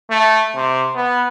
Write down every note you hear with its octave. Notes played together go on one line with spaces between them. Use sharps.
A3
C3
B3